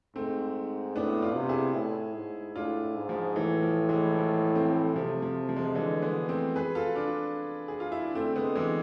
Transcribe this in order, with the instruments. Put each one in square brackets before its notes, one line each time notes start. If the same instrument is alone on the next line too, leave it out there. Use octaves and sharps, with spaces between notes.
[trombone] G#2 [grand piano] A3 C4
[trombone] A2 [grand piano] B3 D4
[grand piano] D4 F4
[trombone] C3
[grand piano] E4 G#4
[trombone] A2
G#2
[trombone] A2 [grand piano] D4 F4
[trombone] G#2
[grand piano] F3
[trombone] A2 [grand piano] E3
[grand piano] F3
E3 G#3
F3
A3 C4
[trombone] C3 [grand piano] F3 A3
[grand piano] F3
F3
G#3
F3
[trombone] D3 [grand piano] E3 G#3
[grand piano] G#3 B3
A3 C4
G#4 B4
F4 A4
D4 F4
G#4
F4
E4
D4
[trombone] D3 [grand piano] A3 C4
[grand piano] G#3 B3
E3 G#3